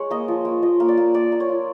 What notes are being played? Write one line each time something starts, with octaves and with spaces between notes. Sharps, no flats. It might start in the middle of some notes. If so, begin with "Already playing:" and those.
Already playing: G#3 C#5
A#3 D#5
F3
A#3
F3 D#5
A#3
D5
A#3
A#3 D5
A#3
C#5
F4